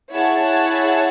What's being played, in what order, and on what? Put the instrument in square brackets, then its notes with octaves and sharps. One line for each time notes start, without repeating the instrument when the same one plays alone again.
[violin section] E4 G#4 C#5 F#5 A5